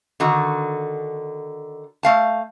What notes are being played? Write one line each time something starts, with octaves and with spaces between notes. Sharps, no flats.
D3 D#3 F#4
A3 F5 A5